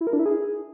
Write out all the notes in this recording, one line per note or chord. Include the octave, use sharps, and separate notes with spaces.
E4
A#4
D4
E4
G#4